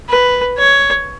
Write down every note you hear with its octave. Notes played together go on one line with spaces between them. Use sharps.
B4
C#5